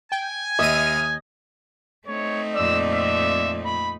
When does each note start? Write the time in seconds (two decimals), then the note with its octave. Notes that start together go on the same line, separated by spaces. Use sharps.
0.12 G5 G#5
0.59 D#2 D#5 E5 D#6 F6 D#7
2.07 A3 C4 D#4 C#5
2.56 F2 A#2 D5 E6
2.94 E5
3.66 B5